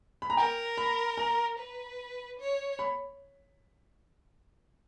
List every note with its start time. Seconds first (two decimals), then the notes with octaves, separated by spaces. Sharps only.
0.22 B5
0.30 A#5
0.37 A#4 G5
0.78 B5
1.18 A#5
1.58 B4
2.39 C#5
2.79 B5